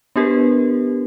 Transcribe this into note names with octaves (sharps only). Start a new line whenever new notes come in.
B3 D4 G4 A#4 B4